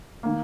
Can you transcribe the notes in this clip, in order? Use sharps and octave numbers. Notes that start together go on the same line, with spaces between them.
D#3 A#3